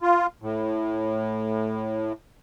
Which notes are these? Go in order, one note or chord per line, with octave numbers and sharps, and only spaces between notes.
F4
A2